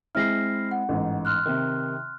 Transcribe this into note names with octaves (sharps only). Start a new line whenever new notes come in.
G#3 C4 E4 F6 A#6 C7
F#5
A1 G#2
C6 F6 F#6
C3 D#3